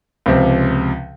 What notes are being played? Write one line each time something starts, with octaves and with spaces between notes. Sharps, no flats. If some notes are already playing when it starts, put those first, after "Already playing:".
C#2 C3 F3